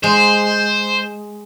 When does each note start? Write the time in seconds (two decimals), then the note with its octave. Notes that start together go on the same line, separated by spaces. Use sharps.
0.04 G#3 C5